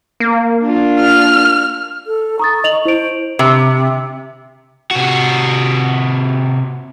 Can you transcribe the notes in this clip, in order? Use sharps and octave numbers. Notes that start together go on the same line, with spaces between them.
A#3
D4 F4
F6
A4
A#5 C#6 D#6 A6
D#5 F7 F#7
E4 C5 D7
C3
C3 F#4